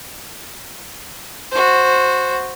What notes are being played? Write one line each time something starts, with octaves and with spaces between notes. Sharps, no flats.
F#4 C5